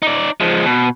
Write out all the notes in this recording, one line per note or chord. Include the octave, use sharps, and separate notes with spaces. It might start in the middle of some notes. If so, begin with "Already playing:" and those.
D#4 D5
F3 G#3
B2